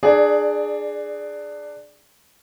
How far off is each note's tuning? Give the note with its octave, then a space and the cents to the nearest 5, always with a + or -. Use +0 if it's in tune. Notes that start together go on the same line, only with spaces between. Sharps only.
D4 +25 G#4 +5 D5 +0